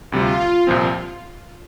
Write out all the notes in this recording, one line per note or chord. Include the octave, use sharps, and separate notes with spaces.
D2 C3 G3 F4
C2 A#2 F3 C4